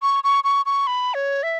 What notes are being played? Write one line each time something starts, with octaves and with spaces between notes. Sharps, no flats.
C#6
C#6
C#6
C#6
B5
C#5
E5